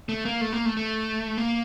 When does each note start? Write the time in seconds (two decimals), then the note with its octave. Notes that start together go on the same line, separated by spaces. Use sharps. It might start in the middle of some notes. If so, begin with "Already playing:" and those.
0.09 A3
0.25 A#3
0.41 A3
0.52 A#3
0.65 A3
0.77 A3
1.38 A#3